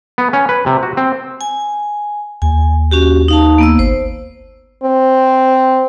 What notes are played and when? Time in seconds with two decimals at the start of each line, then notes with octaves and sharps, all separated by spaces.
0.18 B3
0.33 C#4
0.49 B4
0.66 C3
0.83 F#4
0.97 C4
1.41 G#5
2.42 D#2 G#5
2.91 C#4 F#4 G4
3.28 D#4 F5 A5
3.58 A#3 B3 E6
3.79 G#1 C5
4.84 C4